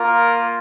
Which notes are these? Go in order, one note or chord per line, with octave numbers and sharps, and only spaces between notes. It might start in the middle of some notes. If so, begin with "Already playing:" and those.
Already playing: A#3 F4 A#4